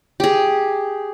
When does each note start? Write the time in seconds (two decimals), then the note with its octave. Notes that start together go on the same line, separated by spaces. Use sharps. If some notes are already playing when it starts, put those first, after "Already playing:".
0.20 G4 G#4